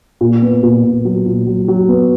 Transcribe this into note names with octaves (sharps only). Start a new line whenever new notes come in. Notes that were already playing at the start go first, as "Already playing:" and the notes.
A#2
B3
A#2
A#2
F#3
A#2
F#3
F#3
B3